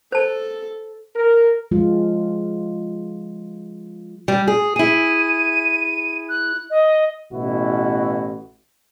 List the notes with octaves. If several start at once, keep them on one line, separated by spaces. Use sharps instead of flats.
A4 C5 A5
A#4
F3 G#3 F4
G3
G#4
E4 G#4 D#7
F#6
D#5
A1 B2 E4 F#4